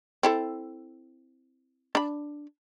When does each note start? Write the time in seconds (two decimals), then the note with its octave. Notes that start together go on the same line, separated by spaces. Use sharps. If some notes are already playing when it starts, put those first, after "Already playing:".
0.23 C4 E4 A4
1.95 D4 B5